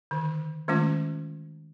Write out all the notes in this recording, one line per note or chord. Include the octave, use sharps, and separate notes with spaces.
D3 D#3
D#3 G#3 A3 C#4 F4